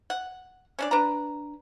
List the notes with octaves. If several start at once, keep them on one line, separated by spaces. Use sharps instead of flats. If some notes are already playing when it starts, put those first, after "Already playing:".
F#5
C#4 D4 D5
D4 B4 A#5